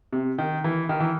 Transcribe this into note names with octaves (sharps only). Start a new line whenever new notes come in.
C3
D#3
E3
D#3
E3